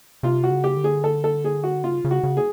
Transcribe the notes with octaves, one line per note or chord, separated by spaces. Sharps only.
C3 F4
F#4
C#3
G4
D3
G#4
A4
A4
G#4
F#4
C#3 F4
C#3
F#4
C#3
G#4